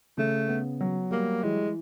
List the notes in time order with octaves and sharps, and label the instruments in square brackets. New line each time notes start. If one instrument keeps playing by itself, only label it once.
[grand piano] C#3 [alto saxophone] A3
[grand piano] B3
F#3
[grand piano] G3 [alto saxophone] A#3
[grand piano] E3 [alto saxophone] G#3